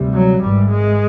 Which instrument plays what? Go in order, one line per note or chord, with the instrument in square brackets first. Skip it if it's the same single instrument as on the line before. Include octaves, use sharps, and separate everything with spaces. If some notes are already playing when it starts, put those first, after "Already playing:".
Already playing: [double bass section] D2 C3 E3 G3
[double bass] F#3
[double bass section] G#1 G#2 E3 [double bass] G3
[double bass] G#3